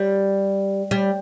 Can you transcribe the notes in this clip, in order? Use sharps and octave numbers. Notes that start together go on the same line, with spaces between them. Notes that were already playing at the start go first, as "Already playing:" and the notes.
Already playing: G3
G3